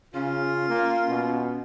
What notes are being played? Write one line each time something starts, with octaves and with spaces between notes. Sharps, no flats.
C#3 C#4 F4
A#3
B2